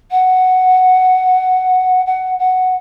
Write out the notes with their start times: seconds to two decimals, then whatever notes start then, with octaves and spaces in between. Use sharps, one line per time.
0.11 F#5
2.06 F#5
2.39 F#5